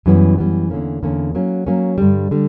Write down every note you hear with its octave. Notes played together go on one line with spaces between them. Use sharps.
F#2 E3 G3 B3
F#2 E3 G3 B3
E2 D3 A#3 C#4
E2 D3 A#3 C#4
F#3 A#3 C#4
F#3 A#3 C#4
G2 D3 G3
D3 G3